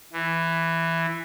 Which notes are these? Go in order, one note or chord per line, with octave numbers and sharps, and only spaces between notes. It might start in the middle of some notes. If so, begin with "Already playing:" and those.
E3